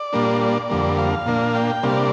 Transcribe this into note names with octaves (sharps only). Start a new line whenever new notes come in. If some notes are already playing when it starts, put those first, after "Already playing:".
Already playing: D5
A#2 G3 A#3 D4
D5
F2 D3 G3 A#3
F5
A#2 A#3 D4
G5
C3 G3 A#3 D4 F5
D5